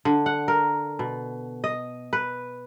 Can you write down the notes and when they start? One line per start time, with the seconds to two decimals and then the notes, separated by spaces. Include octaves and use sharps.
0.05 D3
0.26 F#5
0.48 A#4
0.99 B2
1.64 D#5
2.13 B4